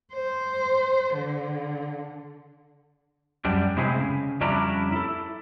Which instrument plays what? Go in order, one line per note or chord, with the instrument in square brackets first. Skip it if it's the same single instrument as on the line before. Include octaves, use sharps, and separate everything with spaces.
[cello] C5
D3
[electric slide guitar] F#2 G3 D4
A2 C3 G#3 C4 E4 G#4
C#3
F2 G3 C#4 D4 E4 A#5
E4 A4